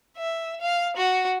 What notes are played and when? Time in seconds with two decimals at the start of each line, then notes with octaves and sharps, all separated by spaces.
0.17 E5
0.61 F5
0.97 F#4